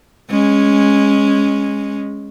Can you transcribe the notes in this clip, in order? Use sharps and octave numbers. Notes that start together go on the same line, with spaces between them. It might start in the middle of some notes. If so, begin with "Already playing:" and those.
G#3 C#4